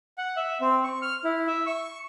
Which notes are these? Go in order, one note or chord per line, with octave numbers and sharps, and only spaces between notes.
F#5
E5
C4
C#6
F6
E4
E5
C#6